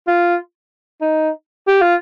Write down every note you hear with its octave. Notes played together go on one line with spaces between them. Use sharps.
F4
D#4
G4
F4